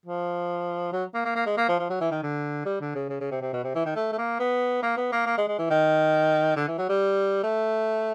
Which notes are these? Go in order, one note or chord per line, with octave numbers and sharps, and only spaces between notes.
F3
F#3
A#3
A#3
A#3
G#3
A#3
F3
F3
F#3
E3
D#3
D3
G3
D3
C#3
C#3
C#3
C3
C3
B2
C3
E3
D#3
A3
A3
A#3
B3
A#3
B3
A#3
A#3
G#3
G#3
E3
D#3
D3
E3
F#3
G3
A3